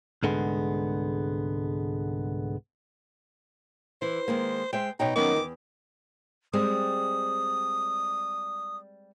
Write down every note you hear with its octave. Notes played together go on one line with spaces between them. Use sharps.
C2 G#2 D3 G#3 B3
E3 C5
D#3 G#3 A#3
G#3 C5 E5 G5
B2 D#4 C#5 G5
D#3 F#3 B3 C#4 D6
E2
G3 G#3 C4 D#6